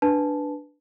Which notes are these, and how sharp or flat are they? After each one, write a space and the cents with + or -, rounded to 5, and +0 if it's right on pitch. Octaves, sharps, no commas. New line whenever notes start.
D4 +0 B4 +0 A5 -15